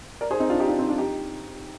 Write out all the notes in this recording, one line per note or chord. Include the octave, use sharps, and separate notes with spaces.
A#4 D5
G#4 C5
C4 D#4
D4 F4
D#4 G4
D4 F4
C4 D#4
D4 F4
D#4 G4